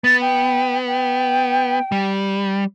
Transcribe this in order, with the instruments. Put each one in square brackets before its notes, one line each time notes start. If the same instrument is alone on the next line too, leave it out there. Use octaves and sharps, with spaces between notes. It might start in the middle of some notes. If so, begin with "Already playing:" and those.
[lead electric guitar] B3 [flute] A6
[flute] G5
G5
[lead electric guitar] G3